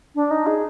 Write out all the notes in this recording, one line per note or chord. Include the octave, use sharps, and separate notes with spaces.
D4
D#4
G#4